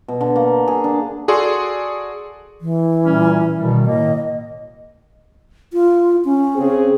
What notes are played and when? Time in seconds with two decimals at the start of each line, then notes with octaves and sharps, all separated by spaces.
0.08 B2
0.21 D3
0.36 A#3
0.68 G#4
0.84 D4
1.28 F#4 G#4 A4 D5 C6
2.61 E3
3.05 A#2 G3 C#4
3.57 B2 D#3 G3
3.86 A2 D#3 A#3 D#5
5.73 F4
6.25 C#4
6.56 C#3 C4 G#4